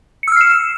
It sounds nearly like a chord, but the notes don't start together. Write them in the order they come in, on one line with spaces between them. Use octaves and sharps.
C#7 E6 F6 C7 E7